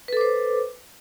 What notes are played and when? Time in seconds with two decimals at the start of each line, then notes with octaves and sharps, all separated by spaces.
0.08 B4
0.13 A4
0.17 D6
0.21 C5